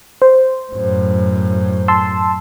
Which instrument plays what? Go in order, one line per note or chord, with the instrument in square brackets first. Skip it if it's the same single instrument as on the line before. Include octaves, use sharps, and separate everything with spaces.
[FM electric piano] C5
[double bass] F#2 A2
[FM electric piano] A5 C6 E6